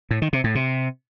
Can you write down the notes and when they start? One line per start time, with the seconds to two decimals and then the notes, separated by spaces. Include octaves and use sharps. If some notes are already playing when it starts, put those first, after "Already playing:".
0.11 A2
0.22 D#3
0.33 C3
0.44 A2
0.55 C3